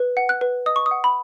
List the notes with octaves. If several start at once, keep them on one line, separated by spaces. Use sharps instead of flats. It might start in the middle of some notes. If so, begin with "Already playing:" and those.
Already playing: B4
F#5
F#6
B4
D#5 D#6
C#6
D#6
F#5
B5